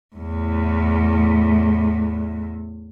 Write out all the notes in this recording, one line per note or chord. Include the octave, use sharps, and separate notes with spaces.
E2 A2